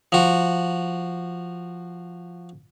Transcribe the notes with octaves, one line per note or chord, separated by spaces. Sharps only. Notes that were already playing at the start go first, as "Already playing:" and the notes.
F3 F#4